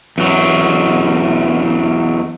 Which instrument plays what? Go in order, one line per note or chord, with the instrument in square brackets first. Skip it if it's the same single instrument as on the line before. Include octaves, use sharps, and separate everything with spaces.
[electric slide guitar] E2 F#3